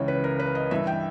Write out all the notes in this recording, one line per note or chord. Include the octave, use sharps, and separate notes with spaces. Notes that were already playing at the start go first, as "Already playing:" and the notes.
Already playing: C#2 C#3 E3 C#5
B4
A#4
B4
D#5
G2 E3 E5
G5